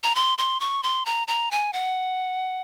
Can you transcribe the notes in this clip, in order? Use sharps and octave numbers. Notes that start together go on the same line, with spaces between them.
A#5
C6
C6
C#6
C6
A#5
A#5
G#5
F#5